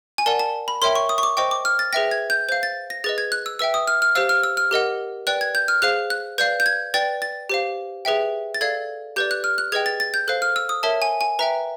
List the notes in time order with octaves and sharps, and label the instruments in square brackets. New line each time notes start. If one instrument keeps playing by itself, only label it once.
[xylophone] G#5
A#4 D5 F#5 A5
A5
B5
A#4 C#5 E5 G5 C6
C#6
D#6
C#6
D6
C5 D#5 G5 C#6
D6
F6
A6
G#4 B4 E5 G5 A#6
G#6
G6
C5 G6
F5
A6
A#6
G#4 B4 D#5 A6
G#6
F#6
E6
B4 E5 G5 E6
D#6
F6
F6
G4 C5 F5 E6
F6
E6
F6
G4 A#4 D#5 F#5
B4 D5 G5 F#6
G#6
G6
F6
G#4 C5 F5 F#6
F#6
B4 D5 F5 G6
G6
G#6
B4 D5 G5 A6
A6
G4 C5 F5
G#4 B4 E5 G5
A6
A4 D5 F5 G#6
G4 B4 D5 G6
F#6
F6
F#6
G#4 B4 D#5 G5 G#6
A6
A6
G6
A4 C5 F5 F#6
F6
E6
D#6
A#4 C#5 E5 A5
G#5
G#5
B4 E5 G5 A#5